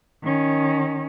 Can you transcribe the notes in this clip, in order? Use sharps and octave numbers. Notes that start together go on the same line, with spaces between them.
D#3 C#4